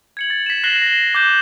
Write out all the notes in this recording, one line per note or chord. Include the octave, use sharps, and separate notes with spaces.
G#6 C#7 F#7
A6
B6 E7
F#6 A#6 C7 E7 F#7 G7
A#6 G7
D6 G6 E7